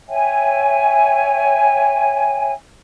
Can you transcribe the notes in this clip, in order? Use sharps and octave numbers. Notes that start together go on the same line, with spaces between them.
C#5 E5 G5 G#5